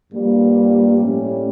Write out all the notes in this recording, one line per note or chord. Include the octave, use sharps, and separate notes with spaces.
G2 F3 G3 A#3
A2 G3 A3 C#4